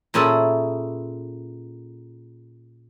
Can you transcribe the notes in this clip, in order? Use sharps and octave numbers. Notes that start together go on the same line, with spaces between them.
A#2 C#4 E4 G#4 A4